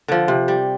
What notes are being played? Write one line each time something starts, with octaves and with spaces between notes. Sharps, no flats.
D3 F3
C3
G3